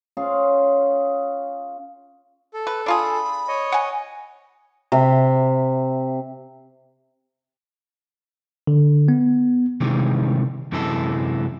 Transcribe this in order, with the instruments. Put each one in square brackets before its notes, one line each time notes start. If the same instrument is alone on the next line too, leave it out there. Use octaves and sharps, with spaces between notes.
[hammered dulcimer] C#4 F4 G#4
[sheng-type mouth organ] A4
[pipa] B4
[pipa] D4 F4 G#4 [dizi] B5
[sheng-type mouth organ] C#5 D#5
[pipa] F#5 G#5
[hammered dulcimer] C3 E5
[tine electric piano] D3
B3
[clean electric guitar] C3 D#3 E3 G3 G#3
F#2 C3 E3 G#3 E4 A4